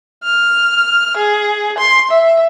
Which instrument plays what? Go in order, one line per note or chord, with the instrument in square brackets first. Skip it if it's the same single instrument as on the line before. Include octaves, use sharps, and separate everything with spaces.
[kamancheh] F6
G#4
C6
E5